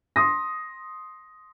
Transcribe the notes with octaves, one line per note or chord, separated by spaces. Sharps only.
C6 D#6 A#6